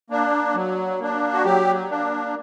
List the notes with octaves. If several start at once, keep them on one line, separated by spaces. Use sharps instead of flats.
A#3 D4
F#3
A#3 D4
F#4
F#3 G4
A#3 D4